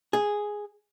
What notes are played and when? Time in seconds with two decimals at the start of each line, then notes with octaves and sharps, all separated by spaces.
0.13 G#4